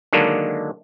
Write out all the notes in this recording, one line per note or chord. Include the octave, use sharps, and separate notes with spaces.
D3 D#3 F#3 G#3 A#3 D4